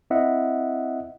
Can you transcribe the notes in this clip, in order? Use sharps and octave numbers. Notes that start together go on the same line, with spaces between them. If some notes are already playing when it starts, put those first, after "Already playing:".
C4 E4 D#5 E5 F#5